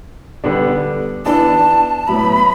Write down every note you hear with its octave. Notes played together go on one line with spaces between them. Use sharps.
D3 G3 B3 D4
E3 B3 D4 A5
A2 F#3 B3 B5